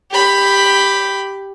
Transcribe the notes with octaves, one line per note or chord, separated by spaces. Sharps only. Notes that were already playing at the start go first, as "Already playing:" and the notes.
G4 B5